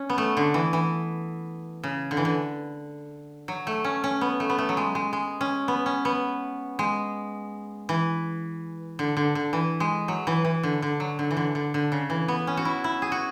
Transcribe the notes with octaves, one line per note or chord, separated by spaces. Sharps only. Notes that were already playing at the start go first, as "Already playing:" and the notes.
Already playing: C#4
B3
A3
D3
E3
E3
C#3
D3
E3
D3
F#3
A3
C#4
C#4
B3
A3
B3
A3
F#3
G#3
G#3
G#3
C#4
B3
C#4
B3
G#3
E3
D3
D3
D3
E3
G#3
F#3
E3
E3
D3
D3
F#3
D3
E3
D3
D3
D3
C#3
E3
B3
C#4
F#4
E4
E4
G#4
F#4